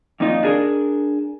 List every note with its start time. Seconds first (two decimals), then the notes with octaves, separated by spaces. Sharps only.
0.20 F2 A#2 D#3 D#4 F4
0.43 D4 G#4 A#4